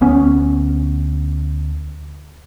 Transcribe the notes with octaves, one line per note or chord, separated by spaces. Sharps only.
D2 B3 C#4